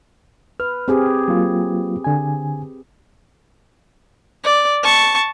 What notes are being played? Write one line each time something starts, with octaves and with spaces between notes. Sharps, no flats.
B4 F6
C4 G4 G#4
F#3 A#3 F4
D3 G#5
D5
A5 C#6